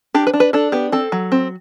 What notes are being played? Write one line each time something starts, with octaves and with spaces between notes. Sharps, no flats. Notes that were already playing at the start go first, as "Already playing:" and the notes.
D4 G4
B4
D4
B4
D4 A4
B3 G4
C4 A4
F#3
C4